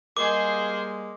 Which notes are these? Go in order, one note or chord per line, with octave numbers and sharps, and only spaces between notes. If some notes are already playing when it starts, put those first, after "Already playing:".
G3 G#3 A#3 G#4 A#4 C5 D#5 D6